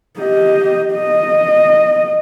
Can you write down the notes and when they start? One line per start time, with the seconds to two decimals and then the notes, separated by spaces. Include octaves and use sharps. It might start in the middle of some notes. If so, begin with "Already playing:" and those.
0.19 G4 D#5
0.93 D#5